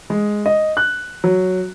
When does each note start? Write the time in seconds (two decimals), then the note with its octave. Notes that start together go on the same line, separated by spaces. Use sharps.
0.10 G#3
0.46 D#5
0.77 F#6
1.24 F#3